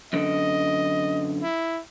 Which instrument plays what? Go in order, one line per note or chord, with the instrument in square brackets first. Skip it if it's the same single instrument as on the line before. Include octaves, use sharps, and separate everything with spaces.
[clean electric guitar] F#2 D3 [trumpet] D#5
[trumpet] E4